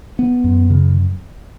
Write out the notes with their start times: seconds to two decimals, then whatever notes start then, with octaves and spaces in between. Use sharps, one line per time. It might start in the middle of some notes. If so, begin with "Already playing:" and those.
0.19 B3
0.44 F#2
0.70 C#3